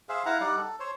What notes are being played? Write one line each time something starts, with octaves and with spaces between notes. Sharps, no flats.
G#4 C5 E5 F5
E4 F5 F#5 A#5
G3 D#4 D5 F#5
A4
C5 C#5